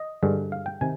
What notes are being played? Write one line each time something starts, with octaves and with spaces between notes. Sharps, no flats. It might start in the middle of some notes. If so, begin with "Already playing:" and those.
Already playing: D#5
G2 D3 G#3
F5
G5
C3 D#3 G#5